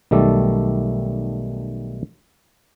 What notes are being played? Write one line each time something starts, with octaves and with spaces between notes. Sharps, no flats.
B1 D#3 G3 A3 A4 D5